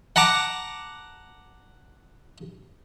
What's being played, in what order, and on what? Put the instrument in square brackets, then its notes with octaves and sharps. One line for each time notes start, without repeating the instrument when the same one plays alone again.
[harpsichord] F#5 A5 A#5 D6